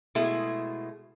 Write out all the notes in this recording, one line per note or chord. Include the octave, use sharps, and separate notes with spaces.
B2 G#3 A3 E4 G#4